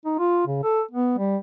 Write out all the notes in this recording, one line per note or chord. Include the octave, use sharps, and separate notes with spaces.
D#4
F4
C#3
A4
B3
G3